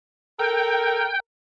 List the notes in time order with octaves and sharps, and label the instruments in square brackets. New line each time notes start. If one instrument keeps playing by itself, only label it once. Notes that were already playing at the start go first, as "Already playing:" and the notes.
[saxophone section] A4 A#4 [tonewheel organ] G5